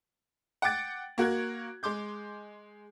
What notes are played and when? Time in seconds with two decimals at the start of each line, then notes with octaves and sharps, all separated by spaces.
0.62 F#5 G5 D6 A6 D7
1.18 A#3 F#4 A#4 F#6 G#6
1.83 G#3 C6 D6 G6